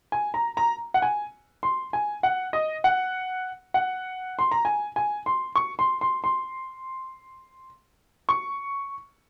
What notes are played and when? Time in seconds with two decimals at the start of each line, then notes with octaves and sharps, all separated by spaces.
0.12 G#5
0.34 A#5
0.57 A#5
0.94 F#5
1.02 G#5
1.63 C6
1.93 G#5
2.23 F#5
2.53 D#5
2.84 F#5
3.74 F#5
4.39 C6
4.51 A#5
4.65 G#5
4.96 G#5
5.26 C6
5.55 C#6
5.79 C6
6.01 C6
6.24 C6
8.29 C#6